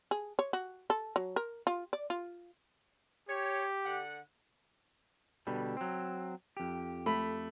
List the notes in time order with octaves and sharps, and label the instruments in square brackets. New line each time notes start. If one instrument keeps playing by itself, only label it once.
[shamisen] G#4
C#5
F#4
A4
F#3
A#4
F4
D5
F4
[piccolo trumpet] G4 [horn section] C#5
[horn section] D3 F#5
[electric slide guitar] B2 D3 G3
F#3 C4
F2 G4
[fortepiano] A3 B5